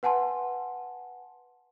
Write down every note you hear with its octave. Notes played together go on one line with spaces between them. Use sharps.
B4 F#5 G#5 A5 C6